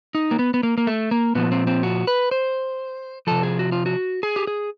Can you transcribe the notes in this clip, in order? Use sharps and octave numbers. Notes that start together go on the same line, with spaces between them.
D#4
A#3
B3
B3
A#3
A#3
A3
A#3
A#2 F3 B3
C4
C4
F#4
B4
C5
C3 F3 A4
G#4
F#4
F4
F#4
G#4
G4
G#4